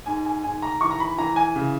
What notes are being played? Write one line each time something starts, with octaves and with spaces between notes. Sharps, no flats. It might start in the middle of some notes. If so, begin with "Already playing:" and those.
G#2 G#5
G#5
G#2 G#5
A#5
E3 C#6
A#5
B5
E3 A#5
G#5
C#3